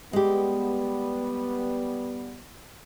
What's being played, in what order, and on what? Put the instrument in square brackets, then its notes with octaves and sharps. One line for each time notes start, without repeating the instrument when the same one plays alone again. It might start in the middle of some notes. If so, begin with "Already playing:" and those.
[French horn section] G3 B3 [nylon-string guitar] G#3 G4